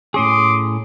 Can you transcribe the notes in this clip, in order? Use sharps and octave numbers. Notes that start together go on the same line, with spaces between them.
A2 C#4 G#4 C6 D6 D#6